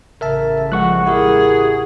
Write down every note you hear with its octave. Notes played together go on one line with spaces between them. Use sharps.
A1 C#3 A#4 E5 A5
F3 G#3 F#5 C#6 F#6
E4 G4 G#4 A#4